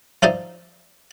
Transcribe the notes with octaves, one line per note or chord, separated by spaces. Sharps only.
F3 D#4 E4 C5 D5 D#5